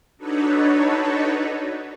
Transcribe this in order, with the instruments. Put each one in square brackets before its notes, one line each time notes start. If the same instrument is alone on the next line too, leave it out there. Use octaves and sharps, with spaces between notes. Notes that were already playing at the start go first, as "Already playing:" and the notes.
[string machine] D4 D#4 F#4 A4 B4 C#5